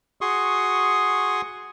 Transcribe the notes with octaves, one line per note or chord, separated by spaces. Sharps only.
F#4 G#4 C6 C#6 D#6